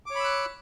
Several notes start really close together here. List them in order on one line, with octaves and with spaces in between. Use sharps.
D6 C#5 B5 E6 F#6